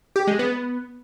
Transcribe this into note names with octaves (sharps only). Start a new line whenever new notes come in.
G4
G#3
B3